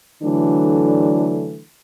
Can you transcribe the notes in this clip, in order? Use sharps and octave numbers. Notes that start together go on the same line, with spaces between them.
D3 E3 F#3 A3 D4